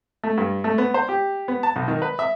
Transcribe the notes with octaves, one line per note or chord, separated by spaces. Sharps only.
A3
G2
A3
B3
C5
G4
B3
A5
B1
D#3
B4
E5